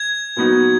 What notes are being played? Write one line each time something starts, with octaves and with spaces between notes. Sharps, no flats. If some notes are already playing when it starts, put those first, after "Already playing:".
Already playing: G#6
A#2 F#3 B3 D#4 F#4